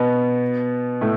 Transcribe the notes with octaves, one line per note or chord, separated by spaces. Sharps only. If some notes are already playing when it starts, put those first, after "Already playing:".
Already playing: B2 B3
A2 A3